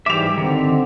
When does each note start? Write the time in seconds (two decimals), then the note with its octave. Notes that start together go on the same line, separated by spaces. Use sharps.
0.06 G#2 E3 G3 G4 E5 D6 F7
0.38 D3 D#3 C4